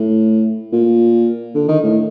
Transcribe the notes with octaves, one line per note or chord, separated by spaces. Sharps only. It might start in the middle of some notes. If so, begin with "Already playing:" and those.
Already playing: A2
A#2
D3
D#3
A2